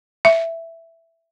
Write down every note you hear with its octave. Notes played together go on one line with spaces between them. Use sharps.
E5